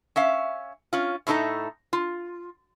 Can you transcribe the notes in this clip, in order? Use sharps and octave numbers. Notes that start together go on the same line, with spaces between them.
C#4 E5 F5
C#4 F4
A2 A3 C4 D#4 A4 A#5
F4